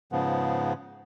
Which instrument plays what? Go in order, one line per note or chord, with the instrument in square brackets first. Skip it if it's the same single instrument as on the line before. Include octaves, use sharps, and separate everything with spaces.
[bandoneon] G#2 C#3 F3 B3